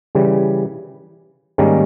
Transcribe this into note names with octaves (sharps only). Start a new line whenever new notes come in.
C#3 E3 G3
G#2 D#3 G3 A#3 C#4